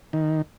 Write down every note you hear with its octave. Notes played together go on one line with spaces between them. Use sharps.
D#3